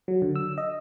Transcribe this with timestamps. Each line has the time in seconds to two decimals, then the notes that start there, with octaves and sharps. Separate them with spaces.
0.08 F#3
0.22 D3
0.36 E6
0.58 D#5